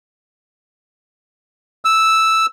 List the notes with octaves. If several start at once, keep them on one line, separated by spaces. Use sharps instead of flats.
E6